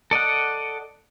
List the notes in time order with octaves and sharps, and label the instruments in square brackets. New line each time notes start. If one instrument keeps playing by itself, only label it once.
[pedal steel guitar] A4 D5 D#5 F#5